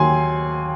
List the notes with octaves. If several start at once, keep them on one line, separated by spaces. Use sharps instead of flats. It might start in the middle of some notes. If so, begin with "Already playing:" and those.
Already playing: D#2 D#3 F#3 G#5 C6